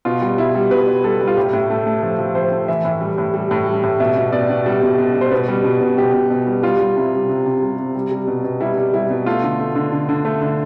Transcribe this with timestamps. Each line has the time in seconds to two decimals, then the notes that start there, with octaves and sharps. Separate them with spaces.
0.05 B2 F4
0.22 G3
0.38 B2 E4
0.55 G3
0.71 B2 B4
0.87 B2
1.04 G3 A4
1.21 G3
1.27 F4
1.37 A2 G4
1.53 A2
1.70 A3
1.86 A3
2.02 F3 A4
2.19 F3
2.35 F3 C5
2.52 A3
2.68 E3 E5
2.85 A2
3.01 G3
3.18 A2
3.34 G3
3.51 A2
3.67 G3
3.83 A2
4.00 B2 E5
4.17 B2
4.32 B2 D5
4.50 B2
4.66 G3
4.83 B2
4.98 B2
5.15 B2
5.21 C5
5.31 B2 B4
5.48 G3
5.64 B2
5.81 B2
5.98 B2 G4
6.13 B2
6.30 B2
6.47 G3
6.63 G3 F4
6.80 G3
6.96 C3 E4
7.13 G3
7.29 C3
7.46 C3
7.62 G3
7.79 C3
7.95 G3
8.12 G3
8.27 B2
8.44 B2
8.61 G3 E4
8.77 G3
8.93 G3 E4
9.10 B2
9.26 A3 F4
9.43 D3
9.60 A3
9.75 D3
9.93 D3
10.09 D3
10.25 A3
10.42 D3